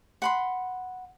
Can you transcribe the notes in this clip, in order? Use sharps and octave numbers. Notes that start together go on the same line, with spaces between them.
F#5 B5 C6